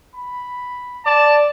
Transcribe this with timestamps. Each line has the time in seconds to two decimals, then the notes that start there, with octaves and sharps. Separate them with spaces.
0.15 B5
1.06 D5 A5